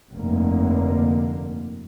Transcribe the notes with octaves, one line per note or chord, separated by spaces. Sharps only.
F1 G2 D3 A#3